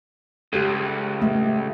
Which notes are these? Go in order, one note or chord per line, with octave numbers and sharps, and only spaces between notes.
C#2 G4 A4
A3